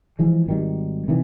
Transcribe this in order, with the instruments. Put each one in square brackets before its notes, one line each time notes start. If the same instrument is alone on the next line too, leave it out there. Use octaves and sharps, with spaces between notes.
[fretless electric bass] E3 F3 G#3
G#1 D#3 G3
C3 D#3 E3 G3